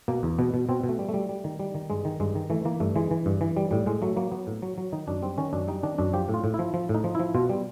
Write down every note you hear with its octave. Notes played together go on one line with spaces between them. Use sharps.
B2 A#3
E2
B2 B3
B2
B2 C4
B2
A3
G3
A3
G3
G3
D#3
G3
D#3
G2 G#3
D#3
G2 G#3
D#3
E3 A3
E3 A#3
G2 A3
E3 G#3
E3
G2
E3
G3
A2 G3
A2 G#3
F#3 A3
F#3 A#3
F#3 B3
A2
F#3
F#3
D#3 D#4
F#2 D4
G3 C4
D#3 C#4
F#2 D4
G3 D#4
D#3 D4
F#2 D4
F3 G4
A2
F4
A2
E4
F3
F3
A2
D#4
F3
F3 E4
B2 F4
G3